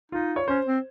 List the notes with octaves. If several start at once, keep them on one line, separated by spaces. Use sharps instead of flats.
D#4 F4
C#5
C#4 C5
C4